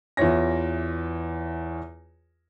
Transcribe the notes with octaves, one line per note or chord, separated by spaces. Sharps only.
E2 E3 F4 C#5 A#6